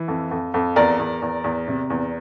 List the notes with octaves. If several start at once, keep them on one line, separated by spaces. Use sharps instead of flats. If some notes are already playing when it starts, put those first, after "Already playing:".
Already playing: E3
F2
F2
F2
E2 A#4 D5
E2
E2
E2
C3
E2